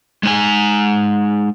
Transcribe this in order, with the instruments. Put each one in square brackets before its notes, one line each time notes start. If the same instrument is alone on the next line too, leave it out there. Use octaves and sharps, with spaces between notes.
[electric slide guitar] G#3 D#4 G#5